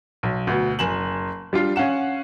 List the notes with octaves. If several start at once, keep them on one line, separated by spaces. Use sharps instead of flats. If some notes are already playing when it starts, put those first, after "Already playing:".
B1
D2 B2
F#1 G#5 E7 F#7
G3 D4 F4
C#4 F5 F#5 E7